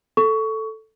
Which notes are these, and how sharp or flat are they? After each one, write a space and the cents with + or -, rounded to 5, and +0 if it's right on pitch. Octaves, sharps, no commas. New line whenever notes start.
A4 +0 C#6 +20